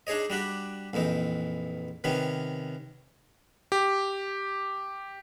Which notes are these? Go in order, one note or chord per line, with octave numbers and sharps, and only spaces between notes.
D4 D#4 G#4 C#5 D#5
G3 D4 F#4 G4
A#1 F2 E3 D#4
C3 D#3 B3 C#4
G4